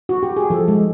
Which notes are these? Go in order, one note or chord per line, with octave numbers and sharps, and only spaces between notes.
F#4
G4
G#4
F3 A4
G#3